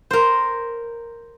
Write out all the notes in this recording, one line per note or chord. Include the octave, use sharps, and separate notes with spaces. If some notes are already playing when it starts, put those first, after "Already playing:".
A#4 C5